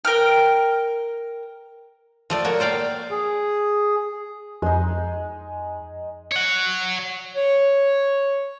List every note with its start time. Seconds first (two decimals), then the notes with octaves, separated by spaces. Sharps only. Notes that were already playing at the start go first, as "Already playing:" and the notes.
0.05 A#4 G5 F6
2.30 F3 A3 D5
2.44 A#3 F#4 C#5
2.60 C5 D5 F5 G5
3.11 G#4
4.62 F2 G#3 D#4
6.32 C#5 F#5
7.35 C#5